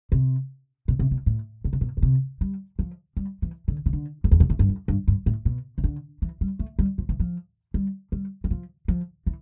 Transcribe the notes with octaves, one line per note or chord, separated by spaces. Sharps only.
C3
B2
C3
B2
A2
B2
C3
B2
B2
C3
G3
F3
G3
E3
D3
C3
D3
F2
E2
B2
A2
G2
F2
G2
G2
A2
B2
C3
D3
E3
G3
A3
G3
F3
E3
F3
G3
G3
E3
F3
F3
E3